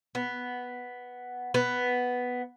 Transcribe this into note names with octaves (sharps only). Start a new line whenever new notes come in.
B3
B3